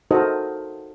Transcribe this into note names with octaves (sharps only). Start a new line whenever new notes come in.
D#4 F#4 A4 A#4 C5 D#5